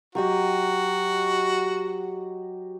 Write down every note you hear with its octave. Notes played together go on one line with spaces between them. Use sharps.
F#3 F#4 G4 D#5